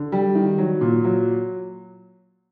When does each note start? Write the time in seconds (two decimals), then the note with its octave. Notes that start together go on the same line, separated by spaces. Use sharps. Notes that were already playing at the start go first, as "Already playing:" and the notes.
Already playing: D3
0.12 G3
0.35 D#3
0.58 F#3
0.81 A#2
1.04 F#3